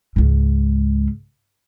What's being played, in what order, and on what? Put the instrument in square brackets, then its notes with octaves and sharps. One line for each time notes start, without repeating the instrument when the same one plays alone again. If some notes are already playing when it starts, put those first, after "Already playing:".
[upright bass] C#2 G#2